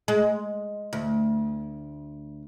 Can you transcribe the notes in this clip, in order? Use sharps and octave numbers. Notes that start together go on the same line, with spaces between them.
G#3
D2